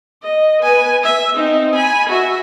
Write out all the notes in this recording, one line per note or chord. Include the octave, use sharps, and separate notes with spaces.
D#5
B4 G#5
E5
C4 D#4
G#5 B5
F#4 E5